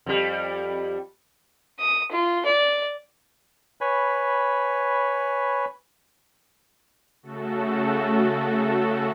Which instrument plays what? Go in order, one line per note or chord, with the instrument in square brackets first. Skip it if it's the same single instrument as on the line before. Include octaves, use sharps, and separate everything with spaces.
[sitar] F2 G3
[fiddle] D#6
F4
D5
[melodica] B4 C#5 G#5 B5
[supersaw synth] C#3 A3 F#4 A4